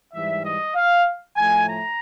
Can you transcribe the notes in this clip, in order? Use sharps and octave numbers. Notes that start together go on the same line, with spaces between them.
G#2 E3 G3 E5
D#5
F5
A2 F3 A3 G#5
A#5